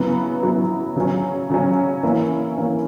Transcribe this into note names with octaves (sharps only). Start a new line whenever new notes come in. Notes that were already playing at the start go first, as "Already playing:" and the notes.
Already playing: C#3 F#3 B3 E4
C#3 F#3 B3 E4
C#3 F#3 C#4
C#3 F#3 C#4
E3 A#3 C#4 E4
E3 A#3 C#4 E4